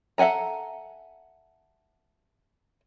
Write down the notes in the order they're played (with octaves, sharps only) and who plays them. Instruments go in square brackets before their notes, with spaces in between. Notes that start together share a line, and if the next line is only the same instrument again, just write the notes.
[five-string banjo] A4 E5 F#5 G#5 A#5